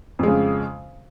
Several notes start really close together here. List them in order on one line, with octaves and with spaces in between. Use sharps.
F2 G#3 C#3